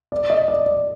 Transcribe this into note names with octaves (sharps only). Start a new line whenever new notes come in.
D5
D#5
D5
D5